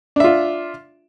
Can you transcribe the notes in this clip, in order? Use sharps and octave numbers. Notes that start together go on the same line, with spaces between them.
D4 F4 E5